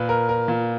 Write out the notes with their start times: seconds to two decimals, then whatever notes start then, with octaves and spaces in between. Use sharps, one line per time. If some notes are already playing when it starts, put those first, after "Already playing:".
Already playing: A#2 B4
0.09 A#4
0.29 A#4
0.48 A#2